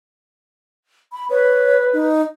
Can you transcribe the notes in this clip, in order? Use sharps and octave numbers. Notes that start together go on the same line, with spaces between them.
B5
B4 C#5
D#4